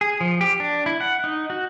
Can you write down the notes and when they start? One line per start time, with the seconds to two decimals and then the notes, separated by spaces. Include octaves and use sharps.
0.01 G#4
0.21 F3
0.41 G4
0.60 D4
0.86 E4
1.00 F#5
1.24 D#4
1.50 F#4